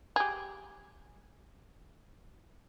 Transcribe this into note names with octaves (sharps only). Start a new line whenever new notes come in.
G4 G#4